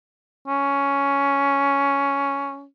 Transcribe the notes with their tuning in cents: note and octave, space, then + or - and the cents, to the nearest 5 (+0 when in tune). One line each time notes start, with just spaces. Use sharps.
C#4 +10